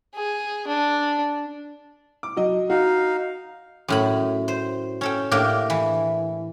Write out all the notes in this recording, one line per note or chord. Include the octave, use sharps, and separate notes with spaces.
G#4
D4
D6
F#3 D#5
D#4 F#4 F5
F#2 A2 B5
C5
C#4 A4 G5
A2 A#3 D4 G4 A#4 G5
E3